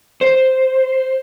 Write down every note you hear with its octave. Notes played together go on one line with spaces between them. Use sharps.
C5